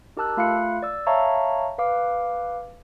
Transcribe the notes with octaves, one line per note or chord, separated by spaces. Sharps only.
D#4 G4 A#4 A5 E6 F#6
A3 F4 F5 B5 F#6 C#7
D5 E6
C#5 E5 F5 A5 A#5 C#6
B4 F5 D6